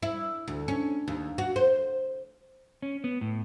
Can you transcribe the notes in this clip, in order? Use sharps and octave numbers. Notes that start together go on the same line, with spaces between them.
E4
D2
C#4
D#2
F#4
C5
C#4
B3
A2